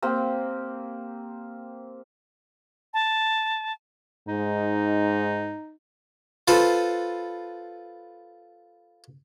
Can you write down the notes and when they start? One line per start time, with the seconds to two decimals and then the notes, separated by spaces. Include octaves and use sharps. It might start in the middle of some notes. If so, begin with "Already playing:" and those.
0.02 A#3 C4 G4
2.94 A5
4.28 G#2 D#4
6.48 F4 A4 B4 C5